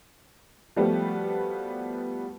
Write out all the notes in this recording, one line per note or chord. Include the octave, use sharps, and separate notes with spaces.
F3 G3 A3 B3 F#4 G4